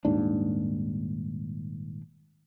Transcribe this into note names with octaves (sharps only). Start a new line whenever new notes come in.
D#1 D#2 G#2 D4